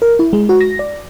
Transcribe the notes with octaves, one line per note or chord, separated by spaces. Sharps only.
A#4
E4
G#3
F#4
A#6
D5